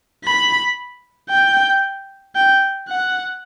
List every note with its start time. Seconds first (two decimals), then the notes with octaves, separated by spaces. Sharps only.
0.25 B5
1.30 G5
2.35 G5
2.88 F#5